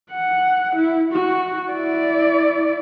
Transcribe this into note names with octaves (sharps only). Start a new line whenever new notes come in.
F#5
E4
F#4
E4 D5